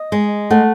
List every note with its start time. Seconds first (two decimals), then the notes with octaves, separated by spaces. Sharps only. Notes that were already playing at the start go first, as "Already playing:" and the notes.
Already playing: D#5
0.12 G#3
0.50 A3 F#5